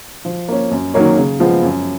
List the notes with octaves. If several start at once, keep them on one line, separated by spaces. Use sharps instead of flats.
F3
A#3 C#4
F#2
D#3 F#3 A#3 C#4
C#3
F3 G#3 B3 F4
F#2